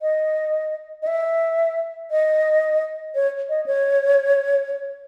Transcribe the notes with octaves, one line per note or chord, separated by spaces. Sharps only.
D#5
D#5
E5
D#5
C#5
D#5
C#5